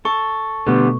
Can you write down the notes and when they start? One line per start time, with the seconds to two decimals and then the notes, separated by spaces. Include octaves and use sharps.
0.05 A4 C#6
0.66 B2 D3 G3 A3 B3